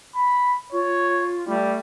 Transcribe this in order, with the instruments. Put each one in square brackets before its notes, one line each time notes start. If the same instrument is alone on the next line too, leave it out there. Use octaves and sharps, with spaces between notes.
[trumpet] B5
[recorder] F4 [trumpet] C#5
[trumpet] G3 [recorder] A3